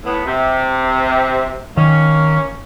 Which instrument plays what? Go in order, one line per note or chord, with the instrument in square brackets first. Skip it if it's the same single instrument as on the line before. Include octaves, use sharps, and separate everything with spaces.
[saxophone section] A2 B3
C3
[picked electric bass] D#3 [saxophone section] A#3 C#4